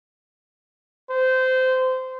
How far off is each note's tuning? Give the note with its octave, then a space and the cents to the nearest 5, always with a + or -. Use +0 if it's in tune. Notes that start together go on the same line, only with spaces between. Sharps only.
C5 -20